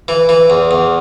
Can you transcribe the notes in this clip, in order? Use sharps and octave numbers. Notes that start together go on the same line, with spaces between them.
E3
E3
E2
E2